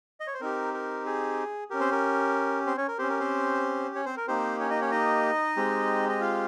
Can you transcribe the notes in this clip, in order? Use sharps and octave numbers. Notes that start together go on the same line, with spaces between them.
D#5
C#5
C5
C4 D#4 G4 A#4
A#4
G#4
C#4 G4 A#4
C4 C5
A#4
C4 C5
C#4 C#5
A#4
C4 C#4 G4 C5
A#4
C4 C5
C#4 C#5
C4 C5
A#4
A#3 C4 D#4 G4 C5
C#4 C#5
D#4 D#5
C#4 C#5
D#4 D#5
G#3 C4 G4
D#5
F4 F5